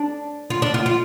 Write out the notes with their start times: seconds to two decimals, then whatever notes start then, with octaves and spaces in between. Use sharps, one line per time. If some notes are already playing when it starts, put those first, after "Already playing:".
Already playing: D4
0.50 F4
0.62 D4
0.74 F4
0.86 F4